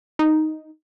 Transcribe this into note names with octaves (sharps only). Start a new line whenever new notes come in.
D#4